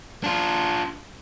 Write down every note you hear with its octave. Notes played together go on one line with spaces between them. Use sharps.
D4 F4